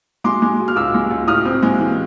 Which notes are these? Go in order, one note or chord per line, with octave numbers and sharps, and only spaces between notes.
G#3 C6 D6
G#3
B2
F6
C#2 D6 E6
G#3
C#2
A2 D#6 F6
C4
G#3
E3